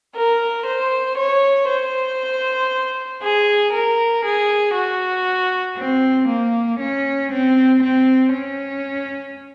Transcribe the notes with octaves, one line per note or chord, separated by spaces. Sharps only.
A#4
C5
C#5
C5
G#4
A#4
G#4
F#4
C4
A#3
C#4
C4
C4
C#4